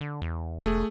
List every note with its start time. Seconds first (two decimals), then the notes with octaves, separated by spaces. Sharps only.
0.01 D3
0.22 E2
0.66 E1 A3 G#4